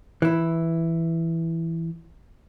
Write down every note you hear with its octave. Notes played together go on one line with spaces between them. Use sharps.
E3 E4